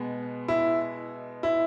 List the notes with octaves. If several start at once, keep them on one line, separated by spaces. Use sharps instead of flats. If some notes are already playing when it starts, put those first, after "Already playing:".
Already playing: B2 G#3 B3
E4
E4